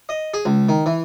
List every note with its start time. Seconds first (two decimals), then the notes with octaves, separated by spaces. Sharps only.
0.09 D#5
0.34 G#4
0.45 C#2
0.69 D#3
0.86 E3